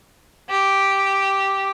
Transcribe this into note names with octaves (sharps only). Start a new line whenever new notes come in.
G4